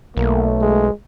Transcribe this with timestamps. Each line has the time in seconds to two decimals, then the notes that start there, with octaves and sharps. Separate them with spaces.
0.17 B1 A3 A#3
0.61 G#3